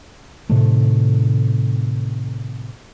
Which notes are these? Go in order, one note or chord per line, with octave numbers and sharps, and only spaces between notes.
A2 C3 D#3 A3